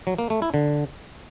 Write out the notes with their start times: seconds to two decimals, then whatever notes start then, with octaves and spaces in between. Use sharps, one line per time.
0.07 F#3
0.19 A#3
0.30 A3
0.42 E4
0.54 D3